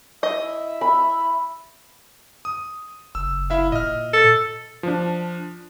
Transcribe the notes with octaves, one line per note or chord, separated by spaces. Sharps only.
E4 D#5 E5
B5
D#6
F#1 E6
E4 E5 F5
A#2 D#5 F6
A4
F3 D4